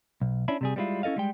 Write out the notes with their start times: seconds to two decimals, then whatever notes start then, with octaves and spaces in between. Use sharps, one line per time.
0.22 B1
0.48 C#4 D4 E4
0.61 C3 G3 G#4
0.76 G3 G#3 B3 E4 F4
1.03 C#4 E4 A4 D#5 F5
1.16 G3 G#3 G5